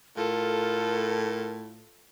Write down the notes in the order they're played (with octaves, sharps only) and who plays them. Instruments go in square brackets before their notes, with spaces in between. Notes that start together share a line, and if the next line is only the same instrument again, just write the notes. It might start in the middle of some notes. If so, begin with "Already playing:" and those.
[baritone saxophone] A2 [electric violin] F4 A4 [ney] A#4